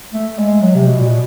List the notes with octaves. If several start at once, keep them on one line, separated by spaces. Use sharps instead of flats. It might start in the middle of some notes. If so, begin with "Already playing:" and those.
A3
G#3
F#3
C3
B2
A#2
B2